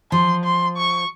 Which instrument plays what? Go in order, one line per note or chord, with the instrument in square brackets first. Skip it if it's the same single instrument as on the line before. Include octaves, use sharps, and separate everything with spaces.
[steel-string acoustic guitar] F3 [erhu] C6
[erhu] C6
C#6